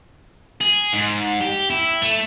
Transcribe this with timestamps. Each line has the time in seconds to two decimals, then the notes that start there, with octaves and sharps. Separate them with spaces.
0.61 G#4
0.93 G#2
1.41 G4
1.70 E4
2.02 A3